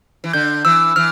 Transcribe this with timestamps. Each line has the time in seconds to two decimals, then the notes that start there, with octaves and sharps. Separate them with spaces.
0.24 E3
0.33 D3 G6
0.65 E3 E6
0.96 E3 F6